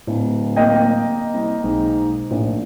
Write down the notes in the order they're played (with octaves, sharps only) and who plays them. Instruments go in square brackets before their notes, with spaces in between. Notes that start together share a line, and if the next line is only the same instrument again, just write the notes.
[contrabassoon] D1 [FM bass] A2
[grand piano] A#3 D#5 G5
[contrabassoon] C2
[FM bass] B1 [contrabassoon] G#2
[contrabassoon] A#1 [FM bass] A2